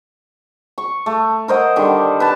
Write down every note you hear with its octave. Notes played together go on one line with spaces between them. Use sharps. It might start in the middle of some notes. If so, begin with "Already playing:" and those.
C#6
A3
A#4 C5 D#5 F#5
D3 D#3 G3
B4 A5